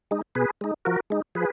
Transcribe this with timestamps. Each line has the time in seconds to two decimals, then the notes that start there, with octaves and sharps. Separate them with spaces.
0.11 G#3 D#4
0.35 B2 G#4 B4
0.61 G#3 D#4
0.85 F3 F#4 A#4
1.10 G#3 D#4
1.35 F3 G#4 B4